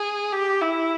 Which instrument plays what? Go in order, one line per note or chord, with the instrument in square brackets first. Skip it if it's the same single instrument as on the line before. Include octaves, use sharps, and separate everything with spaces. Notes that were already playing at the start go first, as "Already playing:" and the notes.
Already playing: [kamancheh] G#4
G4
E4